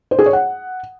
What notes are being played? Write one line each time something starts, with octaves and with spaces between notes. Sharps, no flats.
C5
G#4
C#5
F#5